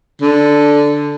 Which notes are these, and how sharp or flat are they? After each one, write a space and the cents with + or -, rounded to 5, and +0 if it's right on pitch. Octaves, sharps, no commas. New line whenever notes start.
D3 -5